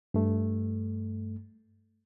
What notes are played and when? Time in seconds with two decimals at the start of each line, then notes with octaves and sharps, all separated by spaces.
0.14 G2 A3